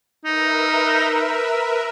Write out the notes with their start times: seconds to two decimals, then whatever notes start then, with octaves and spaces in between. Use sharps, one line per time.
0.25 D#4 A#4 B4 E5